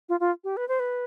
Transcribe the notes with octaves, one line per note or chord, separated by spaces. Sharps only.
F4
F4
G4
B4
C5
B4